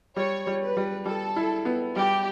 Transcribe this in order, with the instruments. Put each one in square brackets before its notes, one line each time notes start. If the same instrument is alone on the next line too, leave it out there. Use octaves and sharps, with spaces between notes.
[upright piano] G3 [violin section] C#5
[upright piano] G3
[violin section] B4
[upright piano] G3
[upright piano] G3 [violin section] A4
[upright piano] E4
B3
[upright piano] G3 [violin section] G4